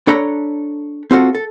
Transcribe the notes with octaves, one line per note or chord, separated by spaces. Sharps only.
D4 A4 C#5 A#5 B5
C4 F4 F#4 A4
A4